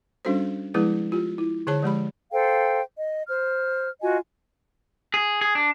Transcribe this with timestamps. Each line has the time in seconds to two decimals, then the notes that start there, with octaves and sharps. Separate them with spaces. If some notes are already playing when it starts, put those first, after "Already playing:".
0.25 G3 C#4 D4 F#4 A4 C5
0.74 F3 G#3 B3 E4 G#4 B4
1.12 F4 G4
1.38 E4
1.67 D3 G#4 C#5 A5
1.83 F3 G#3 G4 B5
2.33 A4 C5 F5 G5
2.96 D#5
3.29 C5 F6
4.01 F4 F#4 D#5 G#5
5.14 G#4
5.41 G#4
5.55 D4